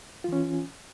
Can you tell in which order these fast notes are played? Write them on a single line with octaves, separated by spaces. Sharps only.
F4 E3 C#4